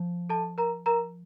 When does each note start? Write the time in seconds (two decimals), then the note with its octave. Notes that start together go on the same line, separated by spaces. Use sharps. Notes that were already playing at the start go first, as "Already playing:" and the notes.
Already playing: F3
0.30 A4 A5
0.58 A#4 A#5
0.86 A#4 A#5